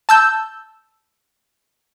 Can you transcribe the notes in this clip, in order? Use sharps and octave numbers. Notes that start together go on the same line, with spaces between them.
A5 E6 G6